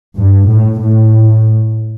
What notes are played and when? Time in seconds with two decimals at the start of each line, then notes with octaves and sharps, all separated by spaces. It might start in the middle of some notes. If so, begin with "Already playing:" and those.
0.17 G2
0.49 A2
0.81 A2